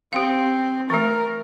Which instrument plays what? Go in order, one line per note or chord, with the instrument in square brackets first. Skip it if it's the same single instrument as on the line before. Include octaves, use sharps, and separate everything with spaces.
[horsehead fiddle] C4 [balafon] G4 F5
[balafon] E3 A3 [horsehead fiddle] A#4